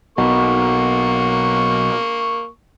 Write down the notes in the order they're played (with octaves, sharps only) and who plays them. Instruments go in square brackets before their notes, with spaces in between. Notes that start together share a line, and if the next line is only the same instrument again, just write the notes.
[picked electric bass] B1 B2 [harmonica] A#3 C#6